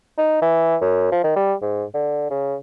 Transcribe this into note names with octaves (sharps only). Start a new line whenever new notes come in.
D#4
E3
F#2
F3
D#3
G3
G#2
D3
C#3